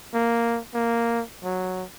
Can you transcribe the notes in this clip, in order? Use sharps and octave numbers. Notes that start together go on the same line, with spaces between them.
A#3
A#3
F#3